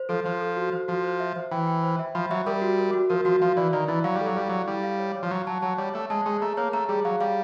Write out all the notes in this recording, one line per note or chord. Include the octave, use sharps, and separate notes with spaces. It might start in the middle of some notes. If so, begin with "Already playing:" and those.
Already playing: C5
F3 A4
F3 C5
A4
F#4
C5
F3 F#4
C5
E5
C5
E3 G5
G5
C5
E5
F3 B5
F#3 E5
G3 A#4
F#4
A#4
F#4
F3 A#4
F3 F#4
F3 F5
E3 D5
D#3 D5
E3 E4
F#3 F5
G3
A4
F#3
G3 F5
F#3 D5
G3 E4
F5
C#5
C#5
F3
F#3 F#5
F#3 A5
F#3 A5
G3 C#5
A3 C#5
G#3 A5
G#3 G#4
A3 A#5
A#3 C#5
A3 A#5
G3 G#4
F#3 F5
G3 F5